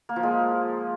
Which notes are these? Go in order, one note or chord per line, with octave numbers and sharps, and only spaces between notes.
A#3
F3
G#3